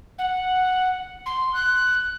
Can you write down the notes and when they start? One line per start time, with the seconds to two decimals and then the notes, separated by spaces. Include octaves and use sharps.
0.18 F#5
1.26 C6
1.54 F#6